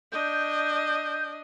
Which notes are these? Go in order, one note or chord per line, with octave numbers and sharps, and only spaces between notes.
D4 D#5 G6